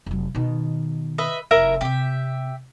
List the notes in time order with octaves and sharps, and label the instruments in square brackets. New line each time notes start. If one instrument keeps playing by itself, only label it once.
[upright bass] F1 F#3
B2 D#3
[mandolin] B4 D#5 E5
[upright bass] F1 [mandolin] E4 A#4 E5
[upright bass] C3 [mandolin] G4 E5